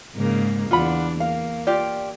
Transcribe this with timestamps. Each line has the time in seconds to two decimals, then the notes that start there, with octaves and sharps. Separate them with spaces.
0.15 G#2 C#3 A#3
0.71 E2 D4 F4 F#5 B5
1.20 A#3 F5
1.67 F4 G4 D5